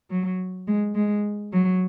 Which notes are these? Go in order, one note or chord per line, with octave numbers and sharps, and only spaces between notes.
F#3
G#3
G#3
F#3